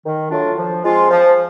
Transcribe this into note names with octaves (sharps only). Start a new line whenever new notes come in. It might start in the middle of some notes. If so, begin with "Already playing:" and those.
D#3
F#3 A3 D4 F4
F3
G#3 C4 F4
F3